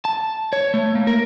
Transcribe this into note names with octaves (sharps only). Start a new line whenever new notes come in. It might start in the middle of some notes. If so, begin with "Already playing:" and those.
A5
C#5
A3
A#3
A#4